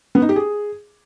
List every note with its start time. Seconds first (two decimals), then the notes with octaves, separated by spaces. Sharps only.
0.15 B3
0.22 D#4
0.29 G4
0.36 G#4